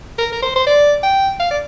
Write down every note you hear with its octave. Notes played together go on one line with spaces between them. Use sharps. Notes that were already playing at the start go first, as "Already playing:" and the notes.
A#4
A#4
C5
C5
D5
G5
F5
D5